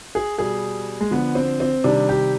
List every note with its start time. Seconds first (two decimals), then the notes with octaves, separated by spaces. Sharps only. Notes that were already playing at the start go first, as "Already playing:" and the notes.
0.15 G#4
0.38 B2 G3 G#4
1.01 G#3
1.11 D3 F3 B3
1.35 C4
1.60 C4
1.84 C3 D#3 G3 D4
2.09 G4